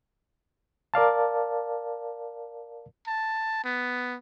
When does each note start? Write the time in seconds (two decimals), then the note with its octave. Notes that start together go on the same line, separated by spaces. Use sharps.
0.94 A#4 D5 F5 A5
3.07 A5
3.64 B3